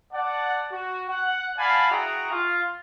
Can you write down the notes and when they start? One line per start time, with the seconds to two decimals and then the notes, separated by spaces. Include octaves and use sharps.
0.13 D5 F#5 A5
0.71 F#4
1.09 F#5
1.58 D5 F5 F#5 G#5 A5 B5
1.90 E4 F#4 G#4 F#5 G5 A#5
2.31 F4